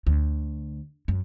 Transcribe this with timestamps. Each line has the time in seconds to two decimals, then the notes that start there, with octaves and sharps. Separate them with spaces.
0.07 D2
1.08 F#2